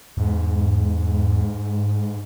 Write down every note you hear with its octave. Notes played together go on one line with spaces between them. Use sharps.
E2 G#2